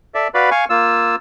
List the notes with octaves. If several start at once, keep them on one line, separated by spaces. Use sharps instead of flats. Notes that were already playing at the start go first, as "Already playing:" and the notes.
A4 D5 E5
F#4 B4 D5 F5 B5
F5 G#5 C#6
A#3 F4 E6